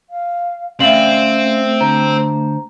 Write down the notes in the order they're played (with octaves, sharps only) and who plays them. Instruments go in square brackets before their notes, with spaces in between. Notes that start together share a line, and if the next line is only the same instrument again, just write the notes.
[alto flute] F5
[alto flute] A3 [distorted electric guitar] C4 [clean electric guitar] C#4 D5 F5 [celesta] E5 F#7
[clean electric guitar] D3 C5 [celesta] A#5